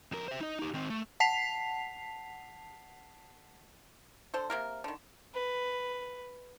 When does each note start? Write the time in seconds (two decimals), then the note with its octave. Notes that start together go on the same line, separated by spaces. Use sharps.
0.12 F2 A#4
0.28 C5 E5
0.41 D#4 D#5
0.59 D#4 G4
0.74 D#3 C4
0.90 A3
1.20 F#5 A5 B6 C7 F7
4.34 D3 A4 C5
4.50 C3 A#3 A#4
4.84 D3 D#3
5.34 B4